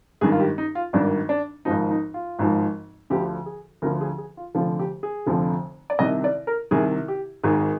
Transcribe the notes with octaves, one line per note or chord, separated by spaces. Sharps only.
G#1 G2 D#3 G#4
F4
G4
D#4
F4
G#1 G2 D#3 D4
D4
G#1 G#2 F3 D#4
D#4
F4
G#1 G#2 F3
D2 D3 F3 G4
G#4
D2 D3 F3 A#4
G#4
G#4
F4
F1 F2 D3 F3 F4
G4
G#4
F1 F2 D3 F3
D5
C2 C3 D#3 D#5
D5
A#4
C2 C3 D#3 G#4
G4
G#1 G#2 D#3 G#4